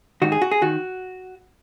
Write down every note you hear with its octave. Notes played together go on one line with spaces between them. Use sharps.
G#2 D#3 F#4
G#4
F#4
G#4
D#3 F#4